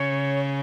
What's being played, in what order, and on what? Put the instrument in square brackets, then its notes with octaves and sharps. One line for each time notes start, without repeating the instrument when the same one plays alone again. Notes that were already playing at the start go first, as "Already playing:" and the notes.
Already playing: [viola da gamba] C#3 [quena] C#5